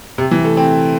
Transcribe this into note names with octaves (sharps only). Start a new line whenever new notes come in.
C3
E3
A3
C4